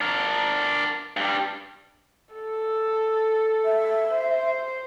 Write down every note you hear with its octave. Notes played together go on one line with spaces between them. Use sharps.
D4 A#4
G2 G3
A4
E5
C5